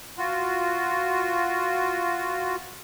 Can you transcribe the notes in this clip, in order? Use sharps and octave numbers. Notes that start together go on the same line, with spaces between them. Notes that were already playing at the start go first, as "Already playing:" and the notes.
F4 F#4